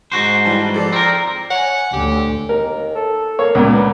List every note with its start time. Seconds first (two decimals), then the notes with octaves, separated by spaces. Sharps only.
0.12 G#2 F#4 C5
0.45 E3 G3 A5
0.74 F3 A4 D5
0.93 C4 A#4
1.50 C#5 F#5 G#5
1.93 D2 G4
2.49 D#2 A#4
2.95 A4
3.39 A#3 C#5
3.55 C#2 A#2
3.73 B3